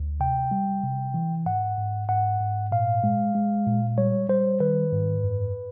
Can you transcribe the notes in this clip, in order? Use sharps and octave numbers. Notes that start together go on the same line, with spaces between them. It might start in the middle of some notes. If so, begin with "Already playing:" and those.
Already playing: D2
C3 G5
G3
C3
E3
G#2 F#5
G#2
G#2 F#5
G#2
A#2 F5
G#3
G#3
A#2
G3 C#5
G3 C5
D#3 B4
G#2
F#2